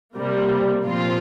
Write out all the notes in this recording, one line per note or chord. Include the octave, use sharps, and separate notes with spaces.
C3 G3 A#3
A#2 F3 C4 F4